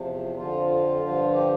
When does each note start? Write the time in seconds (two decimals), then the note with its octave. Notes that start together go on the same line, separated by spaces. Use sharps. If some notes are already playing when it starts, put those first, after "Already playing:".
Already playing: E2 C3 F3
0.36 F2 D3 F3 F4
0.69 F4
1.01 G2 D3 F3
1.33 G4